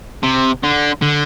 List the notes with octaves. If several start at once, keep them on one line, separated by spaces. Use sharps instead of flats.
C3
D3
D3